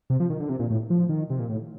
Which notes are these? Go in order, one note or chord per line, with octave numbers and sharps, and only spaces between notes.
C3
F3
D#3
D3
C3
A#2
A2
F3
D#3
C3
A#2
A2